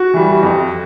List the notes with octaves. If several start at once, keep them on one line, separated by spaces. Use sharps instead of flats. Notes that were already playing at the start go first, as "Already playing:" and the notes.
Already playing: F#4
E3 G3
F2